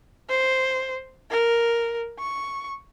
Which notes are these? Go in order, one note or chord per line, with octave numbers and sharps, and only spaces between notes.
C5
A#4
C#6